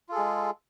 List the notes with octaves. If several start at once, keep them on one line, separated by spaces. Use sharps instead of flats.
G#3 F4 G#4 A4